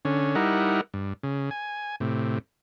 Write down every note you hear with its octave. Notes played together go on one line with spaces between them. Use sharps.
D3 C#4
G3 D#4 E4 A#4 F#5
G2
C#3
G#5
A2 C3